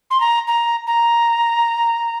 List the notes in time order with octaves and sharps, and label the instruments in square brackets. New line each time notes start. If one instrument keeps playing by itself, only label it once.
[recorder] C6
A#5
A#5
A#5